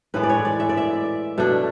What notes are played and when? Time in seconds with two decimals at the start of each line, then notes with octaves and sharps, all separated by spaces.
0.14 A2 E3 G#3 B4
0.23 D5
0.29 C#5
0.45 D5
0.60 E5
0.69 D5
0.77 E5
1.38 B2 A3 D4